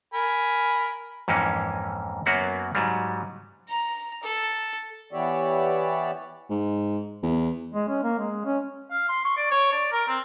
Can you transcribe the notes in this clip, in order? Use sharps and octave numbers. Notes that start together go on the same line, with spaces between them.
A#4 G#5 B5
F2 G#2 E3 A#3 C#4
F#2 F#3 A#3 B3 F#4 F#5
G#2 F#3 G3
A#5
A4
E3 B3 G4 C#5 D5 E5
G#2
E2
G#3
C#4
A#3
G#3
C#4
F5
C6
C#6
D5
C#5
D5
A#4
C4